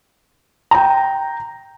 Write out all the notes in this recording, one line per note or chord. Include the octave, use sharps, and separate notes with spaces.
G5 A#5